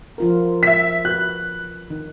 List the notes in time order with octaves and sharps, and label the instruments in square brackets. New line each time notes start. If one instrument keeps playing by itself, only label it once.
[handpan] F3 F4 A#4
[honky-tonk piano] E5 B6
[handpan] F#4 B4 [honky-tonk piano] F#6
[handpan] D#3